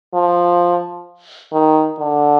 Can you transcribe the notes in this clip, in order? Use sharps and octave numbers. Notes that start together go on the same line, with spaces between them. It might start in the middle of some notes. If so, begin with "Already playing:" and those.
F3
D#3
D3